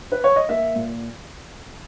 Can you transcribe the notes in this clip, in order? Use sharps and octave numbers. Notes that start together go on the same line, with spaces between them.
B4
C#5
D#5
A#3 E5
A#2